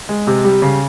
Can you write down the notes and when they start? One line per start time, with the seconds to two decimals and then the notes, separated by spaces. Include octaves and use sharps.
0.09 G#3
0.27 C3
0.44 G3
0.62 C#3